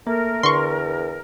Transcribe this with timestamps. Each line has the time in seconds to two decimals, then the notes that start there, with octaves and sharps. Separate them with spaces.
0.07 A3 A#3 A#4
0.43 E2 D3 C6 C#6